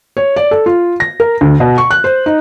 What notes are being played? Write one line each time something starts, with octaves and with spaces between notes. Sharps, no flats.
C#5
D5
A4
F4
A#6
A#4
D2
B2
C#6
F#6
C5
D#4